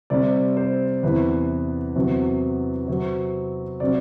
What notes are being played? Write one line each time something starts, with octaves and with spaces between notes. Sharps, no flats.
C3 G3 C4 D5
C5
E2 C3 E3 B4
E2 C3 F#3 C4
C3 F#3 C4
C3 F#3 C4 D5